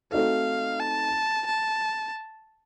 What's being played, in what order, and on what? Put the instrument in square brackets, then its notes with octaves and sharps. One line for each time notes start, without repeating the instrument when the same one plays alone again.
[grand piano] A3 C4 D#4 F#4 A4 [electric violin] F5
[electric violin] A5
A5